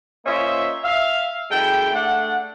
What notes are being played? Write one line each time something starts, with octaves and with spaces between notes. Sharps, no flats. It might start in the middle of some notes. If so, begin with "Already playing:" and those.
A#3 C#4 F4 C5 D#5 E5
E5 F5
F#2 G#3 E4 A4 G5
A3 D4 F#5